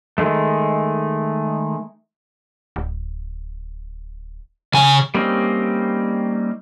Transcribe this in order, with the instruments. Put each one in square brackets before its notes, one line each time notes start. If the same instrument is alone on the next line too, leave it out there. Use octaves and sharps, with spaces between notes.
[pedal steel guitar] D#3 G#3 A3
[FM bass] D1
[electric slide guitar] C#3 G#5
[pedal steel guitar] G3 A#3 C4 C#4 D#4